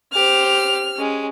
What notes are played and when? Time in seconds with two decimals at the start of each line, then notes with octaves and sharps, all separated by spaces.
0.14 G4 C5 F6
0.96 G#3 C#4